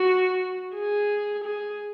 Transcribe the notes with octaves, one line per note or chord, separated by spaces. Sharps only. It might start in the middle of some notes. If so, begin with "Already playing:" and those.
Already playing: F#4
G#4
G#4